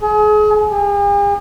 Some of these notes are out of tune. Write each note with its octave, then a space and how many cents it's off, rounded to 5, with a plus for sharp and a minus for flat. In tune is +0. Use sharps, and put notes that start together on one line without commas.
G#4 +35
G#4 -45